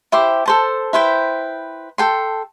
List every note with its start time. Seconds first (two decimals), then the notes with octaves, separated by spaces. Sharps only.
0.12 E4 G4 C5 D6
0.46 A4 C5 A5
0.93 E4 B4 C5 G5
1.98 A4 G5 C6